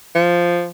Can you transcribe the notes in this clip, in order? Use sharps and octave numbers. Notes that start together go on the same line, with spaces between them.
F3